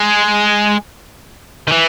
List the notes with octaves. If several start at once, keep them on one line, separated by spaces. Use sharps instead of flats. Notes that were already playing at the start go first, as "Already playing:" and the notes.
Already playing: G#3
D#3
E3